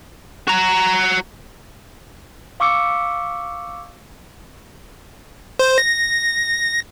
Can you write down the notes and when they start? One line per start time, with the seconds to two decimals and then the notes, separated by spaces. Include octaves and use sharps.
0.47 F#4 A#5
2.60 F5 C#6 D6 E6 C#7
5.59 C5
5.78 A#6